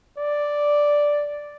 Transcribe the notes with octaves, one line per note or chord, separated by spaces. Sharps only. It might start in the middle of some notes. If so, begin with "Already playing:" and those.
D5